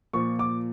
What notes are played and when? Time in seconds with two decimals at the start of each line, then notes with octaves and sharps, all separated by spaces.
0.13 A#2 F3 C#6
0.39 D6